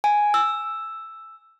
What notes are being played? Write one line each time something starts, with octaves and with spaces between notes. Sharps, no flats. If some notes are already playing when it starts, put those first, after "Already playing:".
G#5
E6